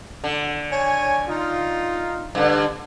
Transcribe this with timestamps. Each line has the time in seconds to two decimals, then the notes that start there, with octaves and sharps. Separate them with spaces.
0.24 D3
0.72 C#5 G#5
1.28 D#4 F4
2.35 G2 D3